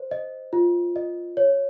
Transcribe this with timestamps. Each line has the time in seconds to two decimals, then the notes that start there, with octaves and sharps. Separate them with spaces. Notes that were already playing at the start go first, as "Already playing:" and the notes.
Already playing: C5
0.11 D#5
0.53 F4
0.96 D#5
1.37 C#5